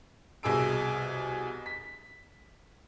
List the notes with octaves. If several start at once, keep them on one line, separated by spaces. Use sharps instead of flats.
C2 B2 G#4 E6 D7
B6